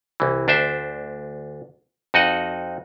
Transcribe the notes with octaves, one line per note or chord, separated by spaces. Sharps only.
C2 E3
D2 D4 C5 E5
F2 D#4 F#4 D#5 F#5